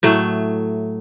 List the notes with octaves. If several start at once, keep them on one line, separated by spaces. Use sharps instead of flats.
A2 F#3 A3